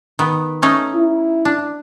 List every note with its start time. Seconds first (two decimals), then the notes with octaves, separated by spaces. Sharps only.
0.19 D#3 B3
0.62 A3 C#4 D#4
0.95 E4
1.45 D4